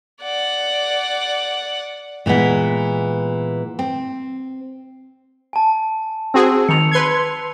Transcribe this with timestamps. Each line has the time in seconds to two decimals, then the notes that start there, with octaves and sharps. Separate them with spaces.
0.22 D5 F#5
2.26 A#2 E3 G#3 B3
3.79 C4
5.53 G#5 A5
6.34 C4 F#4 G#4 E6
6.69 D#3 C#7 F7
6.92 B4 C6 G#6